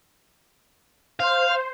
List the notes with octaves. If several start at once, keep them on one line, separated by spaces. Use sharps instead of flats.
C5 F5